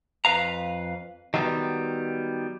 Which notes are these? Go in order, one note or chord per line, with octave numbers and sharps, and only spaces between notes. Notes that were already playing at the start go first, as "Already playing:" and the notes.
F2 B4 F5 A#5
D#3 F#3 G3 B3